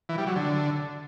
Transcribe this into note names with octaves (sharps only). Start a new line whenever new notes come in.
E3
G3
F#3
D3